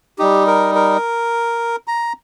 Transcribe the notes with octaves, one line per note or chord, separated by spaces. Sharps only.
G3 D#4 G4
A#4
A#4
A#5